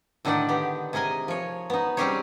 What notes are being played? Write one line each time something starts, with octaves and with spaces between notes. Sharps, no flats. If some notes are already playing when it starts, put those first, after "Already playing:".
A2 D3 D#3 D#4 D5 F#5
B3 G4
C3 G#4 A#4 D#5 G#5
F3 C#5
B3 D#4
G3 C4 C#4 G4 G#4 C#5